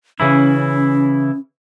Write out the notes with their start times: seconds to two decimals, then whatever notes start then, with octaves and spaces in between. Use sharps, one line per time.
0.20 C#3 E3 C#4 E4